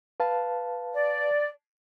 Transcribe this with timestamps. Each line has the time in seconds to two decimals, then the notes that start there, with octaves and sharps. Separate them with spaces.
0.20 B4 F5 A5
0.93 D5